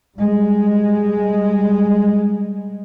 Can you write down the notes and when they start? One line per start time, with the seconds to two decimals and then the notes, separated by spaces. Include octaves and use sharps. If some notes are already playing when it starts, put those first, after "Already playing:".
0.17 G3 G#3